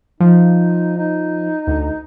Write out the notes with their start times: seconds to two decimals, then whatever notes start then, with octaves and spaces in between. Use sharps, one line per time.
0.20 F3 D#4
0.97 D#4
1.67 D2